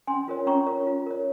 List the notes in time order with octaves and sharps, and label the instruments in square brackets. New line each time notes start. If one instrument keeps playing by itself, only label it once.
[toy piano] C#4 G#5 C6
F4 A#4 C#5
C#4 A#5 C#6
F4 A#4 C#5
F4
A#4 C#5